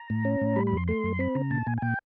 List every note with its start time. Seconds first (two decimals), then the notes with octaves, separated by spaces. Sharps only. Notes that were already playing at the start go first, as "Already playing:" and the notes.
Already playing: A#5
0.10 A2
0.25 C#4
0.41 A2
0.56 G3 B5
0.67 F2 B5
0.77 C6
0.88 A3 C6
1.04 F#2
1.19 C4 B5
1.35 C#3 A#5
1.50 A#2 A5
1.67 A#2 G#5
1.78 G#5
1.82 A#2 G5